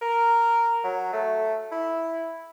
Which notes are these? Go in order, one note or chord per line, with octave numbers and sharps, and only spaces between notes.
A#4
F#3
A3
E4